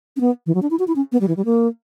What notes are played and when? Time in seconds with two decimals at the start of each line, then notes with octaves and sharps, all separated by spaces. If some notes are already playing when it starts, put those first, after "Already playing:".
0.17 C#4
0.21 B3
0.46 E3
0.55 F#3
0.62 D4
0.71 E4
0.79 F#4
0.88 E4
0.96 C#4
1.12 B3
1.21 G3
1.28 E3
1.37 G3
1.45 A#3